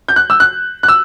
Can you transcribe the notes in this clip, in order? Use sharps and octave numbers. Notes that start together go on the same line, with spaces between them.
G6
F#6
E6
F#6
F#6
E6